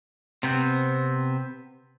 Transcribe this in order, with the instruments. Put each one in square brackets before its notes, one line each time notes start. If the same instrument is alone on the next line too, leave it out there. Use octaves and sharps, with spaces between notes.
[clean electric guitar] C3 B3 C4